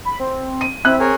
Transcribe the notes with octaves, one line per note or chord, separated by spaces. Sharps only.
B5
C4
D#7
C4 E4 E5 F#6
G#4 A#4 C#5